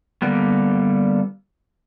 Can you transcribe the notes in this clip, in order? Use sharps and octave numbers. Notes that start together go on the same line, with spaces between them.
D3 G3 A#3 B3